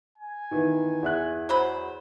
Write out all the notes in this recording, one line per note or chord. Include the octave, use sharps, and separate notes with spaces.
G#5
D#3 E3 B3
E2 E5 F#6
F#3 C5 B5